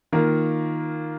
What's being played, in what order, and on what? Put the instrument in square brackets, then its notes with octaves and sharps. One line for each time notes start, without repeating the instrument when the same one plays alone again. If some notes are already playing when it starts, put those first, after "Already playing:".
[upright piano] D#3 A#3 F4 A#4